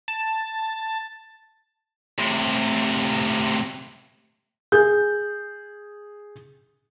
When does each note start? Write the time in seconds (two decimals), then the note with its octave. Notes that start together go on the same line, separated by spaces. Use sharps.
0.08 A5
2.19 A2 C3
4.72 G#4 G6